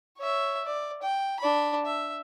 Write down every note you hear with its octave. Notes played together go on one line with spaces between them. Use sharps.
C#5 E5
D5
G5
D4 B5
E5